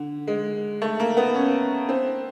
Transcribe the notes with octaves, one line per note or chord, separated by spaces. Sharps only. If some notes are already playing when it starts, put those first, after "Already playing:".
Already playing: D3
G#3
A3
A#3
B3
C#4
C4